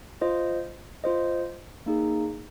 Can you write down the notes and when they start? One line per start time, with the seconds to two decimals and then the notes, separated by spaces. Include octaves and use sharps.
0.21 F4 C5 D#5
1.04 F4 C5 D#5
1.86 A#3 D#4 G#4